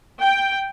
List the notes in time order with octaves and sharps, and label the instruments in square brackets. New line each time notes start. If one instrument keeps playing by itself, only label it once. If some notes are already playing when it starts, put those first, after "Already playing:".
[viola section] G5